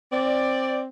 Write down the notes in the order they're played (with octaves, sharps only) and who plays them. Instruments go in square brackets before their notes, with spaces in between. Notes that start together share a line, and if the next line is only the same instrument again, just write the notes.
[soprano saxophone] C4 [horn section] D5